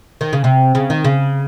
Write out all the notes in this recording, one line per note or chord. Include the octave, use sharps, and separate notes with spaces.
D#3
C#3
C3
C#3
D#3
C#3